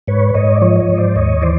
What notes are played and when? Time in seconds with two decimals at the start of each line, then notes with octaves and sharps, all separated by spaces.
0.08 G#2 B4 C#5
0.34 G#2 C#5 D#5
0.55 D5
0.61 F3 C#5 D#5
0.80 C#5 D#5
0.89 G#2
0.97 C5 D5
1.16 D#2 C#5 D#5
1.42 E3 C5 D5